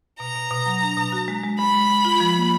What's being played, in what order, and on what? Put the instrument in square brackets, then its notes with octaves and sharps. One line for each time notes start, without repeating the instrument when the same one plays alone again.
[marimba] B2 [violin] A#5
[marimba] B2
B2
F#3
D4
B2
F#4
G#3
G#3
[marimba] G#3 [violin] B5
[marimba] G#3
G#3
F4
F3
A#3